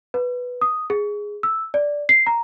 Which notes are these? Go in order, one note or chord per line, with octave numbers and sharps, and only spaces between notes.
B4
D#6
G#4
E6
D5
C7
A#5